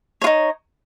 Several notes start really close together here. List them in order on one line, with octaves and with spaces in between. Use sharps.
C#5 F4 D#4